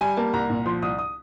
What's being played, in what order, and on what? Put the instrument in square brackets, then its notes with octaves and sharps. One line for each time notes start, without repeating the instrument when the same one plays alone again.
[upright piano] G3 G#5
A#3 A5
C2 A#5
A#2
F3 C6
C2 D#6
D#6